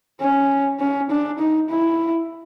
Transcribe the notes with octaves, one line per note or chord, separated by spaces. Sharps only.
C#4
C#4
D4
D#4
E4